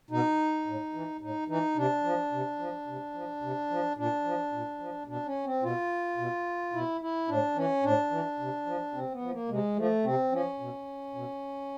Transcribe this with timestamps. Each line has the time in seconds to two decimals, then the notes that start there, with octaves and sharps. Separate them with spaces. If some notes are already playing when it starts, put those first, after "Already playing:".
0.10 B2 D#4
0.66 A2
0.93 E3
1.21 A2 D#4
1.48 E3 D#4
1.76 C3 D4
2.04 F3
2.32 C3
2.59 F3
2.87 C3
3.14 F3
3.42 C3
3.70 F3
3.97 A#2 D4
4.24 F3
4.52 A#2
4.80 F3
5.07 B2 D4
5.26 C#4
5.44 C4
5.63 B2 F4
6.18 B2
6.73 B2 E4
7.01 E4
7.28 A2 D4
7.55 E3 C#4
7.83 A2 D4
8.11 E3
8.39 C3
8.66 F3
8.93 C3 C4
9.12 B3
9.22 F3
9.30 A#3
9.48 C3 G#3
9.76 F3 A3
10.04 C3 C4
10.32 F3 C#4
10.60 B2
11.15 B2